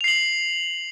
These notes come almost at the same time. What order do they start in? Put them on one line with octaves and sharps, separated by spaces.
F7 C7 F#7